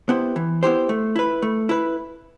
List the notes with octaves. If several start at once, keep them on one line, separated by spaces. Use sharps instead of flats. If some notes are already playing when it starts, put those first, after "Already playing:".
B3 E4 G4 C5
E3
B3 E4 G4 C5
A3
E4 B4
A3
E4 B4